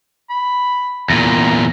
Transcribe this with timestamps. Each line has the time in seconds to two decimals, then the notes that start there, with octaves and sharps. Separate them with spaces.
0.30 B5
1.10 E2 A#2 A#5